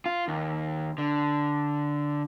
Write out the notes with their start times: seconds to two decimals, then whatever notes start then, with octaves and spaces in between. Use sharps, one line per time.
0.06 F4
0.28 D#2
0.98 D3